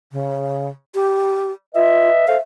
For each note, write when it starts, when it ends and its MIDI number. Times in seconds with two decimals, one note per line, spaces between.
0.12 0.69 49
0.95 1.51 67
1.75 2.09 65
1.75 2.26 71
1.75 2.26 75
1.75 2.26 76
2.28 2.37 69
2.28 2.37 72
2.28 2.41 76
2.28 2.37 77